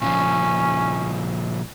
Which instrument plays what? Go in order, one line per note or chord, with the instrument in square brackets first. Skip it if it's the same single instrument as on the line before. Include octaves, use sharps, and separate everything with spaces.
[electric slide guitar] A#2 C#3 F3 [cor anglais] C#4